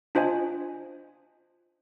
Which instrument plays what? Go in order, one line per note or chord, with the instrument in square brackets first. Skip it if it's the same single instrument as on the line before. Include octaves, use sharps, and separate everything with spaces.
[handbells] D4 F4 C5 D#5 G#5